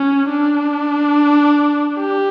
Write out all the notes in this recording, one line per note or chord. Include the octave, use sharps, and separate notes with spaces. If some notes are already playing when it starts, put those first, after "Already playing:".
Already playing: C#4
D4
G4